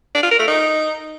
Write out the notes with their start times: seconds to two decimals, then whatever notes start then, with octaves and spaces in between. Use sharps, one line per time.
0.15 D4
0.23 F4
0.31 A#4
0.39 A3
0.48 D#4